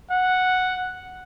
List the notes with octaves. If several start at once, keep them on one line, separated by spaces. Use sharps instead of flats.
F#5